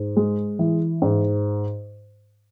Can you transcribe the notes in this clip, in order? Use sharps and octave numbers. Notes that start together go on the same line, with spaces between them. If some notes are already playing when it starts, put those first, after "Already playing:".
Already playing: G#2
G#3
E3
G#2